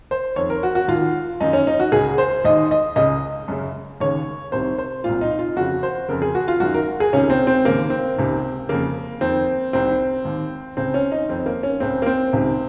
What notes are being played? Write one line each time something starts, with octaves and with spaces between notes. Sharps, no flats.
C5
F2 D#3 C#5
A#4
F#4
F#4
D#2 D#3 F4
F#2 D#3 D#4
C#4
D#4
F#4
C#2 C#3 G#4
C5
D#2 D#3 D#5
D#5
C#2 C#3 D#5
F#2 C#3
D#2 C#3 C#5
C2 C3 D#3 C5
C5
C2 A#2 F4
D#4
F4
F2 C#3 F#4
C5
F2 C#3 A#4
G#4
F#4
F4
F#2 D#3 F#4
A#4
G#4
C#2 C3 D#3 C#4
C4
C4
D#2 C#3 A#3
C4
C#2 C3 D#3
F2 C#3 A#3
F2 D#3 C4
C2 C3 D#3 C4
D#2 D#3
C#2 C#3 C4
C#4
D#4
F2 D#3 C4
A#3
C#4
C#2 C#3 C4
A#3
C4
C#2 C3 D#3